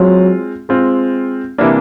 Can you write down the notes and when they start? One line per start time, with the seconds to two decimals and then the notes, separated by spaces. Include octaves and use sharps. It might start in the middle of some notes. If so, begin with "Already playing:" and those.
Already playing: F#3 G#3 C4 F4
0.69 G#3 C4 F4
1.58 C3 E3 G3 A#3 D4